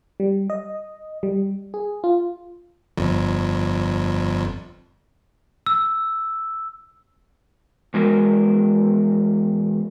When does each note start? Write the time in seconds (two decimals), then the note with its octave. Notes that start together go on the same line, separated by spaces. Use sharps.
0.20 G3
0.50 D#5
1.23 G3
1.74 G#4
2.04 F4
2.97 G1 F2
5.66 E6
7.94 E2 G#3 F#4 A#4